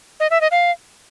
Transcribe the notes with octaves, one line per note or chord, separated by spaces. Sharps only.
D#5
E5
D#5
F5